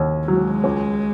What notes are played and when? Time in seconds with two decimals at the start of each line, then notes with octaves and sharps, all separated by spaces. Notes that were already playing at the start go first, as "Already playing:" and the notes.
Already playing: D#2
0.28 F#3 G#3
0.64 C#2